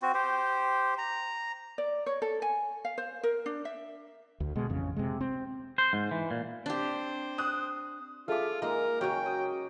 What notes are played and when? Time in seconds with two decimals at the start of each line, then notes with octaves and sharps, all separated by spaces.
0.02 C4 F#4
0.14 G4 C5
0.98 A#5
1.78 D5
2.06 C#5
2.22 A4
2.42 G#5
2.85 F5
2.98 C5
3.23 A#4
3.46 D4
3.65 E5
4.40 D2
4.56 B2 G#3
4.70 A1 F2 C#3
4.96 C3 G#3
5.21 C4
5.78 C5
5.93 G#2
6.11 E3
6.31 A#2
6.66 C4 D4 G4 C5
7.38 D#6 F#6
8.28 F4 G#4 A4 E5 F5 D6
8.62 G#3 A#3 D#4 A#4
9.01 C#3 F#3 C#4 F#4 G5
9.26 D#6